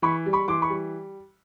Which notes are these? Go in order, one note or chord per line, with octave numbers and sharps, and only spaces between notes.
E3 B5 C#6
G3
B5 C#6
E3 C6 D6
B5 C#6
G3